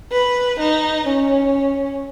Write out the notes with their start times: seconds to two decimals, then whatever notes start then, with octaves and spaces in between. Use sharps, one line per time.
0.12 B4
0.59 D#4
1.06 C#4